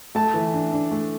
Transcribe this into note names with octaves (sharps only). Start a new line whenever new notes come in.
A3 A5
E3
D4
D4
A3